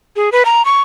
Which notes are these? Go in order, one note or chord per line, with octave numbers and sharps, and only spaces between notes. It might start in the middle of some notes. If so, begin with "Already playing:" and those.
G#4
B4
A#5
C#6